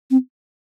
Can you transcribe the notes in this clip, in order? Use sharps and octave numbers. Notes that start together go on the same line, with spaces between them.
C4